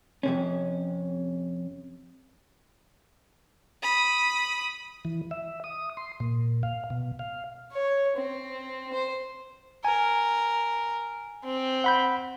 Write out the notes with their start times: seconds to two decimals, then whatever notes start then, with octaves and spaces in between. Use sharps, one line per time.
0.23 F2 C3 C#4
3.82 B5 D#6
5.05 E3
5.31 E5
5.64 D#6
5.97 C6
6.20 A#2
6.63 F5
6.90 B2
7.19 F5
7.72 C#5
8.16 C4
8.93 C5
9.85 A#4 G#5
11.44 C4
11.84 F#5 B5 G6